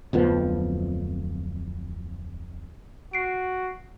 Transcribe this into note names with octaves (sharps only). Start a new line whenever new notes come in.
D1 F2 F3 B3
F#4 C7 D7